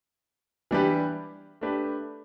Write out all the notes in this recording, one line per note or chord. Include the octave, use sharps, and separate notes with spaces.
E3 G3 D4 G4 B4
A3 D4 G4 B4